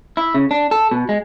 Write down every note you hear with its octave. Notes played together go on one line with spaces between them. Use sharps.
E4
C#3
D4
A4
B2
G#3